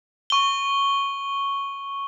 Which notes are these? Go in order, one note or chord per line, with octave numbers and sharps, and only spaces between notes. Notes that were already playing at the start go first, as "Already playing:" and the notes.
C#6 G7